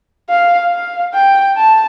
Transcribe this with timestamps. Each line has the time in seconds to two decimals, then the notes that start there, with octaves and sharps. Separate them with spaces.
0.30 F5
0.72 F5
1.14 G5
1.57 A5